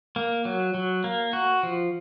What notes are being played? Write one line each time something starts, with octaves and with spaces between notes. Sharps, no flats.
A#3
F#3
F#3
A#3
F#4
F3